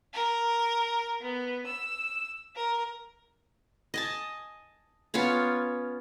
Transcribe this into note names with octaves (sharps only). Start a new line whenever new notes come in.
A#4
B3
E6
A#4
D#5 G#5 A5
B3 C#4 F4 C#5